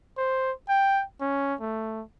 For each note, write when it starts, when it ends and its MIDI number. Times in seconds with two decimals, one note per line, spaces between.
0.18 0.52 72
0.69 1.03 79
1.21 1.54 61
1.61 2.02 57